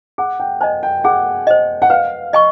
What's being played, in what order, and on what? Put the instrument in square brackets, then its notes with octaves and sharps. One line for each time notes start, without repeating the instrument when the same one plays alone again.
[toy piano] G#4 [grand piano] F#5
[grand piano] G5
[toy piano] C5 D#5 [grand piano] G#5
[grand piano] G5
[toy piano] G#4 [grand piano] F#5
[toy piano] C5 D#5
[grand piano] F#5
[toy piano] B4 [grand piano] F5
[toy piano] D#5 G#5 C#6